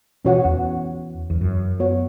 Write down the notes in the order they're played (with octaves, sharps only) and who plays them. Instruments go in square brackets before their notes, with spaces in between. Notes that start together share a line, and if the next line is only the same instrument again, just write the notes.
[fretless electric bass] B2 E3 [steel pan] C#4 F#4 C#5 F#5
[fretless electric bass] E2
E2
F#2
[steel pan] B3 F#4 C#5 F#5